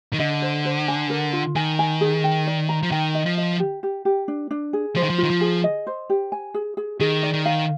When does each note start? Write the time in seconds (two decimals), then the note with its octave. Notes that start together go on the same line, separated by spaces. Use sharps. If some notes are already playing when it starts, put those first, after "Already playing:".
0.13 D#3
0.19 D3 D#5
0.42 C5
0.65 C5
0.88 G#5
1.10 A#4
1.33 F4
1.56 D#3 G#5
1.79 G#5
2.01 G#4
2.24 G5
2.47 D5
2.69 A#5
2.83 F3
2.91 D#3 G5
3.15 D#5
3.26 F3
3.37 D#5
3.59 G4
3.83 G4
4.05 G4
4.28 D4
4.51 D4
4.73 G#4
4.96 F3 C5
5.03 D#3
5.10 F3
5.18 F4
5.23 D#3
5.30 F3
5.41 G#4
5.64 D#5
5.87 C5
6.10 G4
6.32 G#5
6.54 G#4
6.77 G#4
7.00 D#3 G#4
7.23 D5
7.34 D#3
7.45 F5